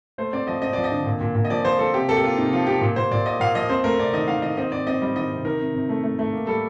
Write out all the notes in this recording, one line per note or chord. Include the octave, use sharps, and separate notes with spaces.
A3 C5
C4 D5
F3 D#5
C4 D#5
F3 D5
D#5
D3
A#2
A#2
A#2
D#5
F3 D5
F3 C5
F3 A4
C3 G4
A#3 A4
G4
A#3 F4
C3 D#4
F3 F4
C3 G4
A#2
A#2 C5
A#2 D5
A#3 D#5
A#2 F5
F3 D#5
C4 C5
A3 A#4
C3 D5
D#3 D#5
D#3 F5
D#3 D#5
C4 D#5
C4 D5
C4 D#5
G3 D#5
D#3 D#5
C3
D#3 A#4
C3
C3
A3
A3
A3
A#3
G3 A4